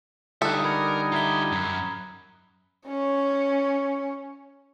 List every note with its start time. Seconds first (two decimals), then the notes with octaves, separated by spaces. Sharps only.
0.42 D3 G3 D#4 F4 A4 E5 D#6 F#6
0.65 A#4 B5 G#6 C#7
1.12 F4 E5 A#5 G#6 G7
1.52 F#2
2.87 C#4 C#5